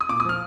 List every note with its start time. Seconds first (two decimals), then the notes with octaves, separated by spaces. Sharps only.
0.01 D#6
0.09 A#2 D6
0.20 D#6
0.25 F3 F6